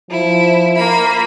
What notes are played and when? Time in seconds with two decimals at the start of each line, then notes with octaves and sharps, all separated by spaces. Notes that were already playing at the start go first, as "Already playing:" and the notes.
0.10 F3 E4
0.77 A#3 B5